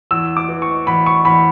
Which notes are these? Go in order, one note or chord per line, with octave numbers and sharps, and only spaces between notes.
E2 E6
D6
E3
C#6
E2 B5
C#6
E2 B5